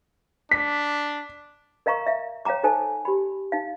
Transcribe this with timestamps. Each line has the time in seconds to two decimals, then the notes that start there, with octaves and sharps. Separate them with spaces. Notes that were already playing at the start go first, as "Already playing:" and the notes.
0.51 D4 B6
1.86 A#4 D#5 F5 A#5 C#6
2.07 E5 F5
2.45 C#5 F5 G5 A#5 D6
2.63 D#4 A4 C5 G#5 A5
3.05 G4 B5
3.52 D#4 F5